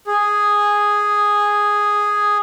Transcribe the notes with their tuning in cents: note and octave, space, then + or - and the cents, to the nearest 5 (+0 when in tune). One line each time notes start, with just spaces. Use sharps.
G#4 -5